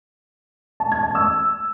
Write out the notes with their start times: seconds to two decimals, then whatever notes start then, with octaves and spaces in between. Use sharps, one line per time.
0.80 A5
0.92 G#6
1.03 A5
1.15 E6